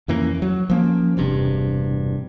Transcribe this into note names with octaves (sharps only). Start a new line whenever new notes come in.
F2 E3 A#3 C#4
F#3
F3 A#3 C#4
E1 G2 C3